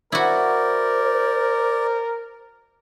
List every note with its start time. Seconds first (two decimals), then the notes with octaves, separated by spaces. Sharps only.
0.12 E4 F#4 A#4 C5 D5